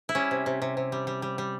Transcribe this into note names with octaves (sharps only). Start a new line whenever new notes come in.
E4
G3 C#4
C3
C3
C3
C3
G3
G3
G3
G3